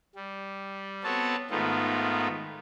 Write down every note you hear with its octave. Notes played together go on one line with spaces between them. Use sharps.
G3
B3 C4 F#4 A4 C#5 A5
G#2 D#3 A3 B3 F4